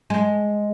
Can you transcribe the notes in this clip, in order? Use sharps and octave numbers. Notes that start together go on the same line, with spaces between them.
G#3